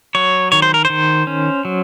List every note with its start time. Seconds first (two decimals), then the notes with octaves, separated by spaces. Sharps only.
0.15 F#3 C#5
0.52 D#3 C#5
0.62 C5
0.74 A#4
0.85 C5
0.90 D#3
1.27 C#4
1.65 F#3